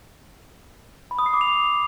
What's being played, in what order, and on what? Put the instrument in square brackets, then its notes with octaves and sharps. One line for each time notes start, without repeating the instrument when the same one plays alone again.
[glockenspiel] B5
D#6
C7
D6
F7